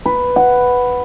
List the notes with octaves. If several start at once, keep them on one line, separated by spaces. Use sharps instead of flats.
B4
F#5